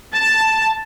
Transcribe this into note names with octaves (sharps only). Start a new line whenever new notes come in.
A5